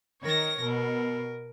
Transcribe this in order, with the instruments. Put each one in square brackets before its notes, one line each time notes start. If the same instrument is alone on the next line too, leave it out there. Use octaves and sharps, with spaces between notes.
[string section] D#3 A#6 [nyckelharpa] A#4 C#5
[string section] B2 [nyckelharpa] A#4